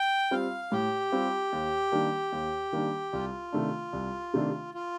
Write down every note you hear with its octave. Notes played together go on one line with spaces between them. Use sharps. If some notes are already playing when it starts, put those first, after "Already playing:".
Already playing: G5
G3 C4 F4 F5
A2 G4
G3 C4 F4
D#2
D#3 G3 A#3 D4
D#2
D#3 G3 A#3 D4
C2 F4
C3 D#3 A3 D4
C2
C3 D#3 A3 D4
F4